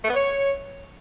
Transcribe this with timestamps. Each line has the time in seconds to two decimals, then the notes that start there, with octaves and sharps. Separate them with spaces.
0.03 A3
0.08 B3
0.14 C#5